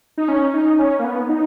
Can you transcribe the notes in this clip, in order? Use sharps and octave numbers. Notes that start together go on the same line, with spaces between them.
D#4
C#4
D#4
C#4
A#3
B3
D#4